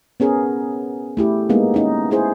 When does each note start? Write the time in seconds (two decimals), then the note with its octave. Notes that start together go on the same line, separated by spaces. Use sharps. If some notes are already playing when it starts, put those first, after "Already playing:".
0.20 B3 C#4 G#4 A#4
1.17 A3 E4 G4
1.49 G#3 A#3 B3 D#4
1.74 C#4 D#4
2.11 D#4 E4 G#4 C5